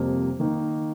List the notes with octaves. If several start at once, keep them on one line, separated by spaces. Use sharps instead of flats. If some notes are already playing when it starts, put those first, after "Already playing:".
Already playing: F2 C3 G3 A#3
D#3 A#3 D#4